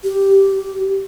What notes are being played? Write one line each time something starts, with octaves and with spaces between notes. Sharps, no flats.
G4